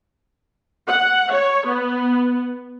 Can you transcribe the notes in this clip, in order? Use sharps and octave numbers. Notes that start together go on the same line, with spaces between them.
F#5
C#5
B3